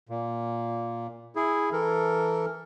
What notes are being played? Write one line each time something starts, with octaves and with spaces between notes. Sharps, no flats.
A#2
E4 G#4
E3 A4 A#4